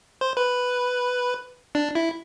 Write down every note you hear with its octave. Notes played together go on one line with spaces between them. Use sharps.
C5
B4
D4
E4